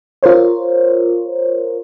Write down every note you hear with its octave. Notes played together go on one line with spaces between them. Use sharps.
F4 A#4 C5 C#5